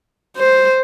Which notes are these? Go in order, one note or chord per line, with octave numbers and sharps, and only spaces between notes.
C5